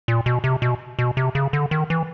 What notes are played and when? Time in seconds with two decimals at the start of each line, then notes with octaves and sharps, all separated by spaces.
0.08 A#2
0.26 B2
0.44 C3
0.62 B2
0.99 B2
1.17 C3
1.35 C#3
1.53 D3
1.71 D#3
1.90 E3